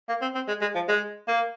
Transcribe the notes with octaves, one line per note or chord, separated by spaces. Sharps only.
A#3
C4
C4
G#3
G#3
F3
G#3
A#3